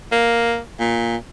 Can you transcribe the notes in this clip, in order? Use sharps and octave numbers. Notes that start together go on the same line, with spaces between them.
A#3
A#2